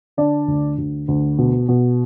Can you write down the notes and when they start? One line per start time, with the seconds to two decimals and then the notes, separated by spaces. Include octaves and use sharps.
0.17 D3 D4 D5
0.48 D2
0.78 D2
1.08 D2
1.38 B2
1.69 B2